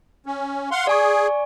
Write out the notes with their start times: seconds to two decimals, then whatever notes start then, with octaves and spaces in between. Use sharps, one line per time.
0.26 C#4
0.71 F5 F#5 C6
0.87 G#4 D5 G#5 C#6